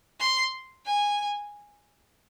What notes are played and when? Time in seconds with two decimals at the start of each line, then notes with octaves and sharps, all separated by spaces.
0.20 C6
0.86 G#5